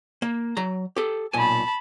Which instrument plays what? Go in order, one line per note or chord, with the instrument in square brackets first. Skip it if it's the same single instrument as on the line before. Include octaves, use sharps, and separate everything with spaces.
[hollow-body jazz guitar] A#3
F#3 A#5
G4 A4
[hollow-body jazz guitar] B1 A#2 G#5 [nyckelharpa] A5 B5